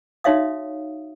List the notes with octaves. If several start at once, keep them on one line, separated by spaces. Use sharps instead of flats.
D#4 F#4 C#5 E5 F5 D#6